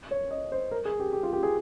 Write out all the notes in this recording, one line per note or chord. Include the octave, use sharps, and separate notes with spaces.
C#5
D#5
C5
A#4
G#4
G4
G4
F4
G4
G#4